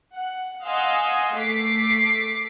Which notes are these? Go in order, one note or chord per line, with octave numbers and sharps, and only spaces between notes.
F#5
D#5 F5 F#5 G#5 C6 E6
A3 D6 B6 C7